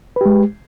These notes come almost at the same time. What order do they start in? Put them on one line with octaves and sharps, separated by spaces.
B4 G4 G#3